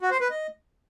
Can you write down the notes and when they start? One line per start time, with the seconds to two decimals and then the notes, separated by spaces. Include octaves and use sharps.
0.01 F#4
0.11 C5
0.20 B4
0.30 D#5